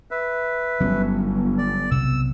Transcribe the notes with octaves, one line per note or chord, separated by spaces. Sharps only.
B4 E5
G1 F#3 B3 C#4
D5
B1 C3 B3 E6